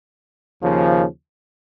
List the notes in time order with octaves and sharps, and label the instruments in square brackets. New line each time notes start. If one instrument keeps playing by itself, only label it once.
[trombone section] D#2 C#3 F3